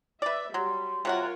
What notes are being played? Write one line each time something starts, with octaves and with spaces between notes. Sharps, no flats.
B4 D5 E5
F#3 G3 C6
C3 F4 F#4 A#4 C#5 F#5